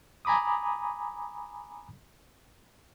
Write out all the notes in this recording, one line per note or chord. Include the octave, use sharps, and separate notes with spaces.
G#5 A#5 B5 D6 D#6